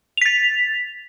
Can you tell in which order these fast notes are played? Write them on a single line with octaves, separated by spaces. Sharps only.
F7 B6 A6